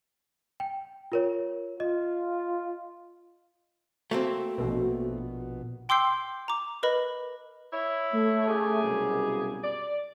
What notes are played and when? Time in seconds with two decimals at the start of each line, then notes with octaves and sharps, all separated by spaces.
0.60 G5
1.12 F4 A#4 C#5
1.80 F4 D#5
4.11 A3 A#3 C4 F#4
4.58 A#1 B2
5.89 G5 C6 D6 E6 G6 C7
6.48 A#5 D6
6.83 A#4 B4 D#5 B5
7.73 E4 C#5
8.13 A3
8.48 C#3 G4 G#4
8.83 C2 F#2 B2
9.63 D5